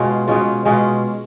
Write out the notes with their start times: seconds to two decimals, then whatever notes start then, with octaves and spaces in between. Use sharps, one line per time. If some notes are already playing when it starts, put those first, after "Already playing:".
Already playing: B2 G#3 C#4 F4
0.28 B2 G#3 C#4 F4
0.65 B2 G#3 C#4 F4